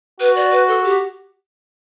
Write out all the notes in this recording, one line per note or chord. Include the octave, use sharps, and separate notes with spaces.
F#4 B4
D5
B4
A4
G4